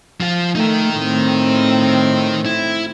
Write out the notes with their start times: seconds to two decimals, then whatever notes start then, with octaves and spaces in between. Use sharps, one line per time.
0.20 F3 F4
0.55 A3 D#4 A#4
0.96 A2 C4
2.45 E4